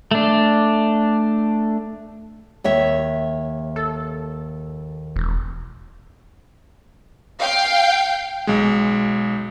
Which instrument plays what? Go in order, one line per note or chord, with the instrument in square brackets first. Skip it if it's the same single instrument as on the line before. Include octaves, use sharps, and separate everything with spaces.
[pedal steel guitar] A3 D4
[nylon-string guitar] D#2 C#5 E5
[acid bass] A4
E1
[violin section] F5 G5
[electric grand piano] B1 G#3